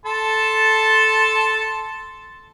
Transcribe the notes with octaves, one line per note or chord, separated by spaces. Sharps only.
A4 A5 C6